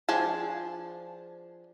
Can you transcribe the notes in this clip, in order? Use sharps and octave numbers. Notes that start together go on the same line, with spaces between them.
F3 D4 G#4 A5